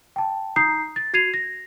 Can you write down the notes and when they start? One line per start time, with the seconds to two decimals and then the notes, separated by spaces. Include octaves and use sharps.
0.16 G5 A5
0.56 D#4 A#5 D#6 G6 C7
0.96 A6
1.13 F#4 G#6 C7 D#7 F7
1.34 A#6